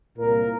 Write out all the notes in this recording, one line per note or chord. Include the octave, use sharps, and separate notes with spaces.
C2 A#2 A#3 A#4